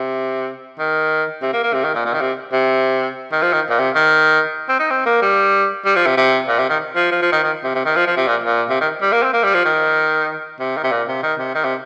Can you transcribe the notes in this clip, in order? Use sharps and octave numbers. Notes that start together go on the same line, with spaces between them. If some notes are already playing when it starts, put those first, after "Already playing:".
Already playing: C3
D#3
C3
A#3
A#3
C3
D#3
A#2
A#2
D#3
C3
C3
D#3
F3
D#3
A#2
C3
D#3
C4
D#4
C4
A#3
G3
G3
F3
C3
C3
A#2
C3
D#3
F3
F3
F3
D#3
D#3
C3
C3
D#3
F3
F3
C3
A#2
A#2
C3
D#3
G3
A#3
C4
A#3
G3
F3
D#3
C3
D#3
C3
A#2
C3
D#3
C3
D#3
C3